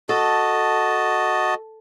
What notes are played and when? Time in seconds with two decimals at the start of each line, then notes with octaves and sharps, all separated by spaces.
0.09 F#4 A4 D#5 A5